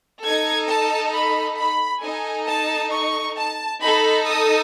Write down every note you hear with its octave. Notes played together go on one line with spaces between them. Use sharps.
D#4 A4 G#6
A5
B5
B5
D#4 A4 G#5
A5
C#6
A5
D#4 A4 B5
D#6